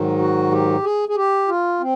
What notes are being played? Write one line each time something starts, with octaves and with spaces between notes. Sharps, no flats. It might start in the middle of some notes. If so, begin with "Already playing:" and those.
Already playing: G#2 D#3 F#3
F#4
G4
G#4
G#4
G4
F4
C4